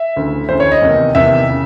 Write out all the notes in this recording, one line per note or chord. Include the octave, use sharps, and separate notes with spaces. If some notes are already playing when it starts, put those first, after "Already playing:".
Already playing: E5
D2 C#3 E3
D2 C#3 E3 C5
C#5
D#5
E2 C3 D#3
E2 C3 D#3 E5
C#3